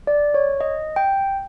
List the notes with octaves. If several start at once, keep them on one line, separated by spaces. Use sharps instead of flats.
D5
C#5
D#5
G5